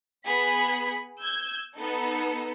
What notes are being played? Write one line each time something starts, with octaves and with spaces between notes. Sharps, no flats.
B3 G#4 B5 B6
E6 G6 G#6
B3 D#4 A4